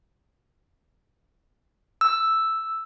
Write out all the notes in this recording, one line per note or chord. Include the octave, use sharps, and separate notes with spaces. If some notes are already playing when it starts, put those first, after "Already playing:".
E6